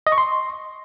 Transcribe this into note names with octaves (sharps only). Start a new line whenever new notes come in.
D#5
C#6
C6